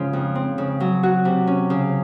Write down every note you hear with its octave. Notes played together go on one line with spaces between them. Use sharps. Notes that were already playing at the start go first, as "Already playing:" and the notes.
Already playing: G#2 C#3 F3
F2
C4
C#3
F#3
F#4
C3
C#4
C#3